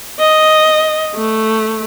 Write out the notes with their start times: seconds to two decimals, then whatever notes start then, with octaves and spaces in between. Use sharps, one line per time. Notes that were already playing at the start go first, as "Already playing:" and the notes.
0.20 D#5
1.15 A3